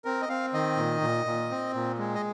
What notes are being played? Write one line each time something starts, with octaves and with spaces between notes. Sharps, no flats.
C4 A#4
D#5
C4 F5
D#3 D#5
A#2
A#2
A#2
C4
A#2
G#3
D#5